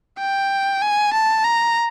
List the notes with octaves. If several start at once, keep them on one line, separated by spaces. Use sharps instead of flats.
G5
G#5
A5
A#5